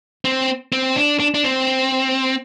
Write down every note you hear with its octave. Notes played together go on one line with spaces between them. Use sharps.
C4
C4
D4
D4
D4
C4